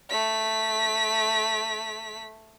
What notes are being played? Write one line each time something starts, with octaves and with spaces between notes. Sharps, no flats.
A3 B6